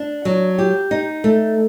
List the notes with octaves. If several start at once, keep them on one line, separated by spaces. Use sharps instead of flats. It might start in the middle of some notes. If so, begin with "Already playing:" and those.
Already playing: D4
F#3
G4
D#4
A3